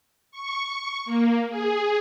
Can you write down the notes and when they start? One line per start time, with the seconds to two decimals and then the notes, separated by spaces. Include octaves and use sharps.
0.32 C#6
1.05 A#3
1.49 G#4